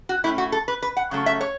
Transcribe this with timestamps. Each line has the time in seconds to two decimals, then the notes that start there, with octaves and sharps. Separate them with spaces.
0.09 F#4
0.24 A2 A3 C#4 E4
0.38 F#4
0.52 A4
0.68 B4
0.82 B4
0.97 F#5
1.11 C#3 F#3 A3 C#4
1.26 E5
1.41 C#5